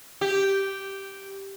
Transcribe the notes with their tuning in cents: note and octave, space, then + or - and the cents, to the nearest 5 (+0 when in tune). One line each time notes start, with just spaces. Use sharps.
G4 -5